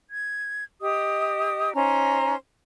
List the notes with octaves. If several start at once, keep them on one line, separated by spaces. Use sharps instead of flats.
G#6
G4 D#5 D#6
C#4 D#4 C5 A#5